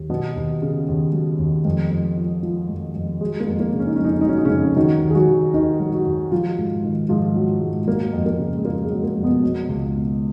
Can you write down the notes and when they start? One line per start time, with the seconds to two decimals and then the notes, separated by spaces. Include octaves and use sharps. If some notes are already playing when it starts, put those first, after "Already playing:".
Already playing: D#2
0.10 B2 F#3 B3
0.36 D#2
0.62 C#3
0.88 D#2
1.13 F#3
1.39 D#2
1.65 F2
1.91 F2
2.17 F3
2.43 F3
2.69 F2
2.95 F2
3.20 F#3 G#3
3.40 A#3
3.47 F2
3.60 A#3
3.73 C#3
3.79 C#4
3.87 D#4
3.96 F2 C#4
4.04 D#4
4.12 C#4
4.21 D#4
4.25 F#3 C#4
4.38 D#4
4.45 F2 C#3 C#4
4.76 D#3 F#3 D#4
5.02 D#2
5.10 G#4
5.15 F#3 F#4
5.28 D#3
5.54 D#2 D#3 D#4
5.80 F#3
5.93 F#3 F#4
6.06 D#2
6.32 F3 F#3 F4
6.58 G#2
6.84 D#3
7.09 G#2 F3 F4
7.36 F#3
7.61 G#2
7.87 F#3 A#3
8.13 F2
8.26 A#3
8.39 C#3
8.57 G#3
8.65 F2 A#3
8.85 G#3
8.91 F#3
9.03 A#3
9.17 F2
9.23 B2 B3
9.43 F#3
9.69 C#2
9.95 B2